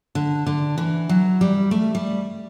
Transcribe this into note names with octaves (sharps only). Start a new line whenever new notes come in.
D3
D3
E3
F#3
G3
A3
G3